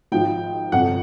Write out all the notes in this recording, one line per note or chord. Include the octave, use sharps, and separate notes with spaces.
G#1 G#2 F3 G5
G1 F2 C3 F#5